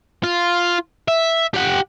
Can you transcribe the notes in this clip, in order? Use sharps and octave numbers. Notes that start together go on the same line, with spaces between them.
F4
E5
G4 F#5